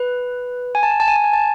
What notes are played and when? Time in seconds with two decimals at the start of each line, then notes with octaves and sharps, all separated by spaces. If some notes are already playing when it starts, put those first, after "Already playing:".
Already playing: B4
0.75 G#5
0.83 A5
0.91 G#5
1.00 A5
1.08 G#5
1.16 A5
1.24 G#5
1.33 A5